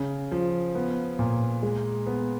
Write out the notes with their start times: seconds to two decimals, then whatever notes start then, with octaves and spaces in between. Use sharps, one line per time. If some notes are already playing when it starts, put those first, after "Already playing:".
Already playing: C#3
0.31 F3
0.75 B3
1.19 A#2
1.63 G#3
2.07 B3